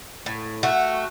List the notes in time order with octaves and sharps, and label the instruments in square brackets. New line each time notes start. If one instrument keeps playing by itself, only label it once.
[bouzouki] A2
A3 F#4